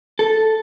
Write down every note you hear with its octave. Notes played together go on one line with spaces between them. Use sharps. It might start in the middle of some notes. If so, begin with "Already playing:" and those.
A4